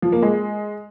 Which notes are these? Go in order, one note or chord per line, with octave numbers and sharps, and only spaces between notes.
F3
A#3
G#3